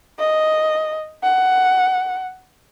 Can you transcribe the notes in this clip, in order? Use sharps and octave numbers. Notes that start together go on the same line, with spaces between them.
D#5
F#5